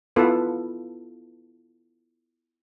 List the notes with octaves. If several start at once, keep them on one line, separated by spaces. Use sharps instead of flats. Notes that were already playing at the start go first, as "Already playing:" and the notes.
B3 E4 F4 A4 B4